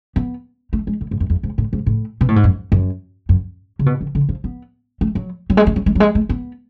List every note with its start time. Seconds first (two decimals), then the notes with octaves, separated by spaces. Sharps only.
0.16 B3
0.73 A3
0.87 G#3
1.01 A2
1.11 G#2
1.20 F#2
1.30 F2
1.43 G#2
1.58 A2
1.73 G#2
1.86 A2
2.21 B2
2.28 A2
2.36 G#2
2.44 F#2
2.72 F#2
3.29 F#2
3.79 C#3
3.86 B2
4.01 D3
4.15 D3
4.29 F3
4.44 B3
5.01 A3
5.15 F#3
5.50 F#3
5.57 G#3
5.67 A3
5.76 F#3
5.86 G#3
5.95 F#3
6.00 G#3
6.15 A3
6.29 B3